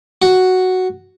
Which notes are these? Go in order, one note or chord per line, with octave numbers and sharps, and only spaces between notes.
F#4